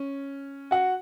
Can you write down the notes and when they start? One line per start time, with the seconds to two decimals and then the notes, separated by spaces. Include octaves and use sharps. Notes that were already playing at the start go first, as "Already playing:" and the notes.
Already playing: C#4
0.71 F#4 F#5